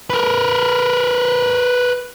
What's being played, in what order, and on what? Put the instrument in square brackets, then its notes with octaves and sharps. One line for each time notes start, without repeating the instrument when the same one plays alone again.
[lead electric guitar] A#4 B4